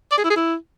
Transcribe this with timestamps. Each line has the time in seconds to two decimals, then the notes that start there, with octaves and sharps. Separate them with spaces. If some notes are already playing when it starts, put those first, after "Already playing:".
0.12 D5
0.18 G#4
0.24 E4
0.30 G#4
0.36 E4